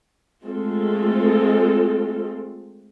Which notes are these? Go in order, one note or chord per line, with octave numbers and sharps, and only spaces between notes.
G#3 A3 C4 F4 A4